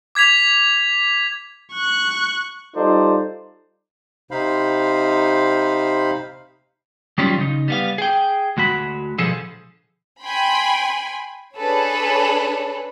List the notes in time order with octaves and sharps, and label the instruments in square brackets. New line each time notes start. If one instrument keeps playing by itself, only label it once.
[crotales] D6 G#6 B6 F7
[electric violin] C#6 F#6
[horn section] G3 D#4 F4 A4 C5 D5
[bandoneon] C3 D#4 C5 F5 B5
[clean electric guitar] D#3 F#3 G3 C#4 F4
C#3 D#4
G3 B3 F5
G#4 G5
D2 G#3 F#4 B5
B2 D3 F3 G#4 A4
[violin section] G5 G#5 B5 C6
D4 G#4 A4 B4 C#5